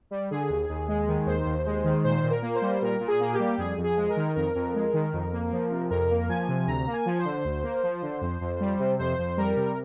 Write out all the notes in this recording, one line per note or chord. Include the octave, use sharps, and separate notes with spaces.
G3
D3 G#4
D#2
D#2
G#3
D#3
D#2 C5
D#2
G#3
D#3
A#2 C5
A#2
A#4
A#3
C5
G3
A#2 A#4
A#2
G#4
A#3
G4
G3
F2 G#4
F2
G#4
G#3
A#4
D#3
F2 A#4
F2
G#3
D#3
F2
A#3
F3
C3
F2 A#4
A#3
F3 G#5
C3
D2 A#5
A#3
G#5
F3
C5
D3
D2
A#3
F3
D3
F2
F2
G3
C3
F2 C5
F2
G3 A#4
C3